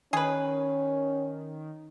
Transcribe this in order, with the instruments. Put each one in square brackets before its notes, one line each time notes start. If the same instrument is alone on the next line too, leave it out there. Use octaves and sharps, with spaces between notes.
[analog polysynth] D#3 [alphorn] C#4 [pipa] G#4 B4